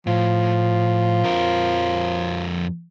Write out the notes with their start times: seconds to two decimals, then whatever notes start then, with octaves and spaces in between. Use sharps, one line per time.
0.07 A2 F3
1.23 F2 A#4